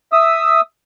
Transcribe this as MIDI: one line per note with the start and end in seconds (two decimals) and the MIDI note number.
0.12 0.61 76
0.12 0.61 87
0.12 0.61 88